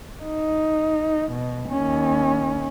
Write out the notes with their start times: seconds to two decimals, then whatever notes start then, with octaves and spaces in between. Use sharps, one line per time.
0.24 D#4
1.32 B2
1.70 D#2 C#4